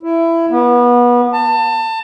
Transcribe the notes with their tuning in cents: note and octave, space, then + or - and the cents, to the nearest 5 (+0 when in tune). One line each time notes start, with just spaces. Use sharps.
E4 +15
B3 -25
A5 +25